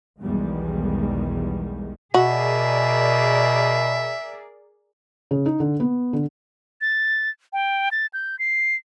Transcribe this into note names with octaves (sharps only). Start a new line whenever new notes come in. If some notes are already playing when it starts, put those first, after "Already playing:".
B1 E2 D#3 G3 G#3
B2 F#4 G#4 A#4 D5 E5
C#3
D#4
D3
B3
D3
A6
G5
A6
G6
C7